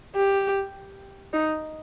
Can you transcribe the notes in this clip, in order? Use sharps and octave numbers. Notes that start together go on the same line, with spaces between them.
G4
D#4